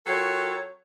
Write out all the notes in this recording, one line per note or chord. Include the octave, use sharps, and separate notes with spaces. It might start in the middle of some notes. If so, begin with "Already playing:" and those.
F#3 C4 F4 A4 A#4 C#5